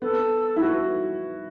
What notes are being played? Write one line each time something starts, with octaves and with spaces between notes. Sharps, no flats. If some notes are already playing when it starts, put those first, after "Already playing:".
B3 A4
E4
F#4 B4